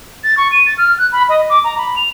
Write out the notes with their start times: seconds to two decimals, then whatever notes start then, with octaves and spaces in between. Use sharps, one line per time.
0.24 A6
0.37 C#6
0.52 D#7
0.66 A6
0.78 F6
0.98 F#6
1.12 B5
1.29 D#5
1.50 D6
1.64 A#5
1.78 B5
1.96 F7